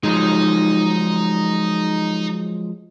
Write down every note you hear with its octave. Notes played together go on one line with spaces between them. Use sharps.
F3 F#3 G#3 D#4